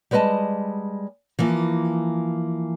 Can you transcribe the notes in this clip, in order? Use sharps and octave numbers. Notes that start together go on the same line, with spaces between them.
G3 G#3 B4 D5 D#5 A5
E3 F3 A#3